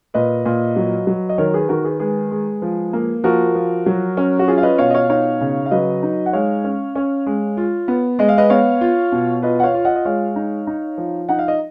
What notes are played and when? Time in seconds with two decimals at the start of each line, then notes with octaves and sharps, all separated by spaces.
0.14 A#2 B4 D#5
0.45 A#2
0.76 F#3
1.07 F#3
1.29 D#5
1.38 D#3 A#4 C#5
1.54 G#4 B4
1.69 D#3 F#4 A#4
1.84 G#4 B4
2.00 G#3 G#4 B4
2.31 G#3
2.62 F3
2.93 A#3
3.24 F3 F#4 A#4
3.55 F3
3.86 F#3
4.17 C#4
4.39 F#4
4.48 F4 G#4
4.58 F5
4.63 B4 D#5
4.78 B2 C#5 F5
4.90 D#5
4.94 C#5 F5
5.10 D#4 C#5 F5
5.41 C#3
5.66 F5
5.71 F#3 B4 D#5
6.03 D#4
6.26 F#5
6.33 G#3 C#5 F5
6.64 C#4
6.95 C#4
7.26 G#3
7.57 F4
7.88 B3
8.19 G#3 D#5
8.29 F5
8.38 B4 D#5
8.50 B3 C#5 F5
8.81 F4
9.12 B2
9.42 F4 B4 D#5
9.60 F#5
9.63 C#5 F5
9.74 F4
9.85 D#5 F#5
9.96 D#5
10.05 G#3 C#5 F5
10.36 D#4
10.67 D#4
10.98 F3
11.29 D#4 F#5
11.39 F5
11.48 D#5